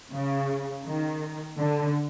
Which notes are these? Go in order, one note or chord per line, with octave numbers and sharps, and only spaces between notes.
C#3
D#3
D3